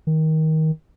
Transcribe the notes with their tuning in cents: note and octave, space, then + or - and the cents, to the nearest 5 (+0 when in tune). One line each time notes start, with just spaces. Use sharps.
D#3 +20